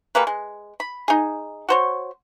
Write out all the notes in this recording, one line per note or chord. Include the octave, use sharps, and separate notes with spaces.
G3 G#3 A#3 B4
G#3
B5
D#4 G#4
F#4 C5 C#5